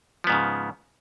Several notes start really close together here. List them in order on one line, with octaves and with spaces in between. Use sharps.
F3 B3 G#2 C#3